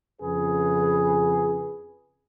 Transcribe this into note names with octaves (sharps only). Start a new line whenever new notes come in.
F2 C#3 G#4 B4